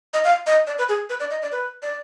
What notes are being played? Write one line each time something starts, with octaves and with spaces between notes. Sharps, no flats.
D#5
F5
D#5
D5
B4
G#4
B4
D5
D#5
D5
B4
D5